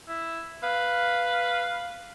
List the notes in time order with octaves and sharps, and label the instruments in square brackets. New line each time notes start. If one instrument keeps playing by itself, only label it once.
[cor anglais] E4
[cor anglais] B4 [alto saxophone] F5